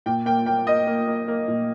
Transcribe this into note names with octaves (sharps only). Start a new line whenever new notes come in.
A#2 G5
A#3 G5
A#3 G5
A#3 D#5
A#3
A#3
A#3
A#2